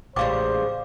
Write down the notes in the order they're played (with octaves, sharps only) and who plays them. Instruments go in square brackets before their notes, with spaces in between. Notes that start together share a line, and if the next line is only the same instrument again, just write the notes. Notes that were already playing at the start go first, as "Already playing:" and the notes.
[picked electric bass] A1 [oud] G#2 C#3 G3 [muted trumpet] C5 [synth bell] F5 D6